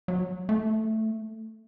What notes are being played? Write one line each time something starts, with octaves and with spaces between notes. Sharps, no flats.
F#3
A3